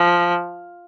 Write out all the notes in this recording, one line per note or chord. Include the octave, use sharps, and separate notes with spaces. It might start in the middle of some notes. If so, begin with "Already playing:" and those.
Already playing: F3